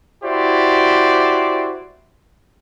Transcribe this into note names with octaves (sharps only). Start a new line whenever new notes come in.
E4 F#4 G4 C5 D5